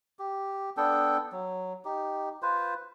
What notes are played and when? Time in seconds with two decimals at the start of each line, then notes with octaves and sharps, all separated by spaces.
0.19 G4
0.77 B3 D4 A4 G5
1.32 F#3
1.85 D#4 G4
2.42 F4 B4 C5